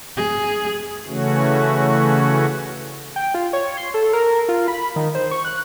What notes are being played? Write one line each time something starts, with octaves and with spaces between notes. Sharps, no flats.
G#4
C#3 E3 A3 C#4 F#4
G5
F4
C#5
C6
A4
A#4
F4
B5
D#3
C5
C#6
F#6